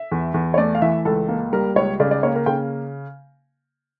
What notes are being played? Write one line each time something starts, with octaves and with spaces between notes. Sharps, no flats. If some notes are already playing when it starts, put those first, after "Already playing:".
Already playing: E5
E2
E2
C#5
A3 D5
F5
E3 E5
C#2 A4
A#3
G3 A#4
C#2 C#5
C#3 D5
D5
A#3 C#5
A#4
C#3 G5